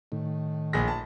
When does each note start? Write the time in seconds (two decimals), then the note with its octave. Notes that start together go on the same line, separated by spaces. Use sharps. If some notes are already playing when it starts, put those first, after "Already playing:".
0.12 A2 D#3
0.73 A#1 G#4 A#6
0.88 A5